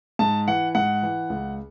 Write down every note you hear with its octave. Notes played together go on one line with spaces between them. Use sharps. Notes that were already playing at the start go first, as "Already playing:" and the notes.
G#2 A5
E3 F#5
G#2 F#5
E3
C#2